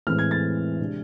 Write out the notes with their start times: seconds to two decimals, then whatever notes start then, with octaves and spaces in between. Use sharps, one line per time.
0.07 A2 E3 G#3 C4 F6
0.19 G#6
0.31 A6
0.80 C3 G#3 D4